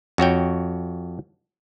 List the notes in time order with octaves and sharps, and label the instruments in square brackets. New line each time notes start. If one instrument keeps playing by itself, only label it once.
[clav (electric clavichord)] F2 F#4 C#5 G5